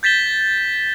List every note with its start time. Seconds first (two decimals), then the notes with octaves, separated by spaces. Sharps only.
0.03 G6 A6 B6 E7 G7